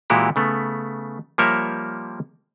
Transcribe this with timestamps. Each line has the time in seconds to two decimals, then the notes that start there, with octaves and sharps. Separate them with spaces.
0.10 A#2 E3 G#3 E4 F#4 G4
0.36 C#3 A3 B3
1.38 F3 G3 A#3 A#4 C#5 E5